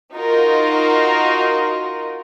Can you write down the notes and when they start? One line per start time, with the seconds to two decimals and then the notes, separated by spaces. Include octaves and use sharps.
0.14 D#4 F4 F#4 A#4